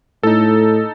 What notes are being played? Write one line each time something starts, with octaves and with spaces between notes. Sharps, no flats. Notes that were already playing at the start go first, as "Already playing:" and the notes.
A2 D#4 A4